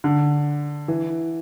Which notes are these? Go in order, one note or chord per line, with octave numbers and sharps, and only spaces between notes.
D3
E3